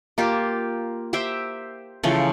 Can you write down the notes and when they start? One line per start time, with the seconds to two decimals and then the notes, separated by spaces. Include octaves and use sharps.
0.18 A#3 F4 G4
1.13 G4 C5 E5 G5
2.03 C#3 E3 F3 A3